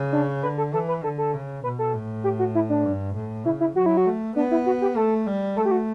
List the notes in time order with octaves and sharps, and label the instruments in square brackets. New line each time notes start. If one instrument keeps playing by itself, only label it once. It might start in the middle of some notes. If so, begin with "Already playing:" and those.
Already playing: [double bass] C#3
[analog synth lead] D4
[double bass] D3 [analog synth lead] B4
[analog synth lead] A4
[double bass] E3 [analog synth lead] A4
[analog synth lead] B4
[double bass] D3 [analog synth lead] A4
[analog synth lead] A4
[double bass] C#3
[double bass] B2 [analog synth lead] B4
[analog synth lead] A4
[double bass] A2
[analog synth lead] G4
F#4
E4
D4
[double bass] G2
A2
[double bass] C#3 [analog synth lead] E4
[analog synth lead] E4
[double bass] F#3 [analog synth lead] F#4
[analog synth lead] E4
F#4
[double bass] A3
[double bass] B3 [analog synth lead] D4
[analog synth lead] E4
F#4
G4
[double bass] A3 [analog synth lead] A4
[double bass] G3
[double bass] A3 [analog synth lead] A4
[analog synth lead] G4
F#4